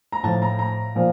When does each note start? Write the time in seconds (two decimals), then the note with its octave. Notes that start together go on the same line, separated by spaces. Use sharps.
0.12 A#5
0.23 A2 F3 A5
0.42 A#5
0.59 A#5
0.95 A#2 F3